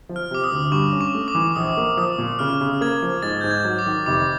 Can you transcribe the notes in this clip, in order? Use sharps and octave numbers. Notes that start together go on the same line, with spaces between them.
F3
F6
C3 D6
D#6
D2
G2 C#6
C#4
C#6
A3
D6
E3
A#1 D#6
A#3
F3 D#6
A#2
C#3 F6
C#3
A#3 G#6
F3
G#2 A6
G#2 G6
G#6
F#3
D6
D#3
F1 D6